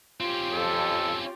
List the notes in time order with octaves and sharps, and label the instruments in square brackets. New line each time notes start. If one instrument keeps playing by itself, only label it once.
[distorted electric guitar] C4 C#4 [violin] F4 G4
[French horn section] F2 [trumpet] A4